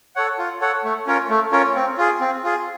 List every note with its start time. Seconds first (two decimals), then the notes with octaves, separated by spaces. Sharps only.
0.16 A4 C#5 F#5
0.38 F4
0.61 A4 C#5 F#5
0.84 A3
1.07 C#4 F4 A#4 C#5
1.30 A3
1.52 C#4 F4 A#4 C#5
1.75 C4
1.98 F4 G#4
2.21 C4
2.44 F4 G#4